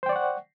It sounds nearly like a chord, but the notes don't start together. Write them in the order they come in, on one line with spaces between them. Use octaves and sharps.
C5 G5 D5 C#6 F#5